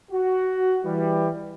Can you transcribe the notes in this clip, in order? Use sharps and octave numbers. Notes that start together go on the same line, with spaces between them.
F#4
E3 G3